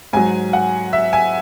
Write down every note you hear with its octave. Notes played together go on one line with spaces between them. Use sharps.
G#2 F#3 G#5
F#5
E5
G#5